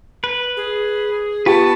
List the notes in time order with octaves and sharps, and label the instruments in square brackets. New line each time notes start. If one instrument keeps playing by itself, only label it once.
[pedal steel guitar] B4
[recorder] G#4
[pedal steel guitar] B3 B4 [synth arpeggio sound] F4 G4 C#6 [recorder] A5